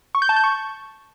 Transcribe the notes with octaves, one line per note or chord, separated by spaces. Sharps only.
C#6
G6
A5
G6
C#6